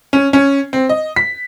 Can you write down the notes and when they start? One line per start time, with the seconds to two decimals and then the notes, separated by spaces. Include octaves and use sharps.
0.13 C#4
0.33 C#4
0.73 C4
0.89 D#5
1.16 B6